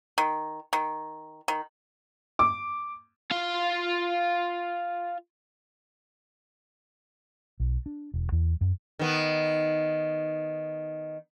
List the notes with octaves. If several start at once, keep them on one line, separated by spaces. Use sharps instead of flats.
D#3
D#3
D#3
D6
F4 F5
B1
D4
E1
E2
F#2
D#3 B3